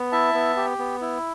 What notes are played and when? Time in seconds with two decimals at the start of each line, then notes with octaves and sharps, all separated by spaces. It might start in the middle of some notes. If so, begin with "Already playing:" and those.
Already playing: B3
0.12 E4 E5 A5
0.34 B3
0.57 G4
0.79 B3
1.01 E4